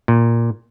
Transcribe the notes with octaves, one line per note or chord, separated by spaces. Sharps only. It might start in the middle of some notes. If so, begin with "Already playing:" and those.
A#2